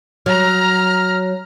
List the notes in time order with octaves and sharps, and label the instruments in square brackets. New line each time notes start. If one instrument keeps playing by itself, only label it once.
[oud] F#3 [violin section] A#5 [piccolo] F6